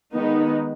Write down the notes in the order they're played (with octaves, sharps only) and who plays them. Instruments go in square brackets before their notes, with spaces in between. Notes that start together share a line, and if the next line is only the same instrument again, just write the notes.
[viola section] D#3 G#3 B3 D#4